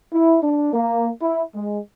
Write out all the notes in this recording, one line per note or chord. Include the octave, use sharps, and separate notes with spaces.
E4
D4
A#3
E4
G#3